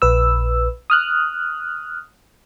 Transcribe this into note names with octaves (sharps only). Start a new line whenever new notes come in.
A#1 B4 E6
D#6 F6 F#6